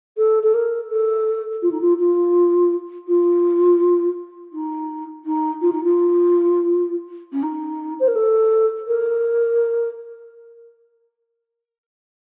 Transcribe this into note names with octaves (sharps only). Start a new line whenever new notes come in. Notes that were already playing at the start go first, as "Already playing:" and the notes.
A4
A4
A#4
A4
F4
D#4
F4
F4
F4
D#4
D#4
F4
D#4
F4
C#4
D#4
C5
A#4
A4
A#4